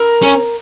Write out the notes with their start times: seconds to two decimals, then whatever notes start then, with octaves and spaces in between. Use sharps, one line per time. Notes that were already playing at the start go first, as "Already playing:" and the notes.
Already playing: A#4
0.22 C#4